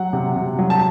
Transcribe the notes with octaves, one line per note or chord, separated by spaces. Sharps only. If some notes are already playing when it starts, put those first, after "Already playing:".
Already playing: F#3 F#5
C3
C3
F#3
A5